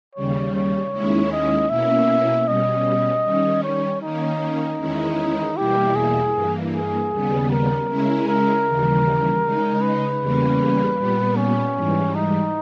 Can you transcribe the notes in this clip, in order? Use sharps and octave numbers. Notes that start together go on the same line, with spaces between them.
D#2 C#3 G3 C#5
C#5
D#2 D#3 G#3 C#4 E4
D#5
B2 A#3 C#4 E4 E5
B2 G3 C#4 D#5
D#3 G3 C#4
C#5
D#3 A#3 C#4 D#4
E2 D#3 G#3 C#4 E4
E2 B2 G3 A#3 E4 G4
G#4
G2 E3 A#3
G#4
D#2 C#3 G3 B3
A#4
C#3 G#3 C#4 E4
A#4
D#2 C#3 E3 G3
C#3 G#3 D#4
B4
E2 C#3 G3 A#3 C#4
A#2 G3 B3
C#4
G#2 E3 G3
D#4